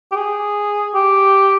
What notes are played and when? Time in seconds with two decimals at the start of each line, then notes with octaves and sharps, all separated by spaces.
0.12 G4
0.16 G#4
0.95 G4